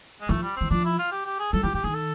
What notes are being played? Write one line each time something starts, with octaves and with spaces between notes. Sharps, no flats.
G#3
F3 A3
G3
E3 C4
F3 D4
E4
F4
G4
G4
G#4
F#3 A4
F3 G4
E3 G4
D#3 G#4
A4